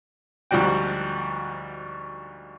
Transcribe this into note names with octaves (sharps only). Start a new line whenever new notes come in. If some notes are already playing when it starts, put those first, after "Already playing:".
D2 G#2 F3 G3 F#4 G5